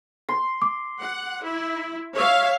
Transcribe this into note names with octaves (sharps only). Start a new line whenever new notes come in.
C6
D6
F#5
E4
C#5 E5 F5